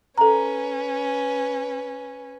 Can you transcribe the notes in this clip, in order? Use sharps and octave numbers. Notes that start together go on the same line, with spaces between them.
C#4 A4 B4 A#5